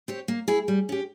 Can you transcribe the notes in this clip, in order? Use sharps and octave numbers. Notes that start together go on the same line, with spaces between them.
C4 G4 C#5
A#3
E4 G#4
G3
C#4 G4